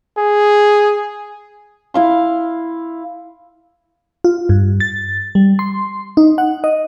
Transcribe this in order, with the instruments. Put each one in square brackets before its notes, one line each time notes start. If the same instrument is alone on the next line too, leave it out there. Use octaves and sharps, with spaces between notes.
[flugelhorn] G#4
[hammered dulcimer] E4 F5 C6
[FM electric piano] F4
G2
A6
G3
C6
D#4
F#5
D#5